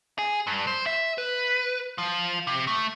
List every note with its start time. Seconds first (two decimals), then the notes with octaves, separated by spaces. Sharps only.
0.19 G#4
0.47 G2
0.67 C5
0.86 E5
1.18 B4
1.98 F3
2.47 C3
2.67 A3